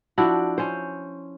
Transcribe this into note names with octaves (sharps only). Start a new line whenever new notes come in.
F3 D4 E4 F#4
C#4 C5